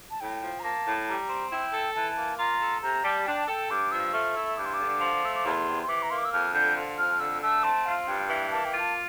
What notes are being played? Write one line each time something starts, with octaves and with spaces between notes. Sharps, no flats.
A5
A2 G5
F3
A#5
A#3 A5
A2
G3 A#5
C4
E4 G5
A4
E3 A5
A#3
F4 A#5
A4
C3 A#5
G3 A5
D4 G5
A4 G5
G2 D6
F3 E6
A3 F6
E4 E6
G2 D6
C6
D6
D3
F3
A3 E6
D6
E2 C6
C3
C6
E3 D6
A#5
A#3 C6
D6
E6
F2 F6
D3 G6
F3
F2 F6
D3 E6
A3 E6
C4 A5
F4 F5
G2 G5
E3
A#3 A5
G5
F4
A5